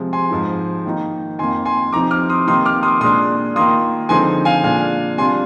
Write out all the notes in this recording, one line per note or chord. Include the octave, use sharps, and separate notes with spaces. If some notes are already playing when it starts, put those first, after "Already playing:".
Already playing: C3 F3 G#3
G#5 C6
G#2 F3 G#3 D#4
D#3 A#3 D#4
F2 D#3 A#3 G#5 C6
G#5 C6
C3 F3 C4 D#4 A#5 D6
D6 F6
C6 D#6
C3 D#3 A#3 D#4 C6 D#6
D6 F6
C6 D#6
A#2 G#3 D4 C6 D#6
D#3 A#3 F4 C6 D#6
D3 F3 G#3 C4 D#4 G#5 C6
F5 G#5
A#2 G#3 D4 F4 F5 G#5
C3 G3 D4 F4 G#5 C6